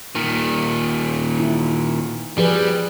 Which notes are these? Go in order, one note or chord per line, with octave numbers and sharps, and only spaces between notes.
A#2 D#3
E4
F3 G3 G#4 B4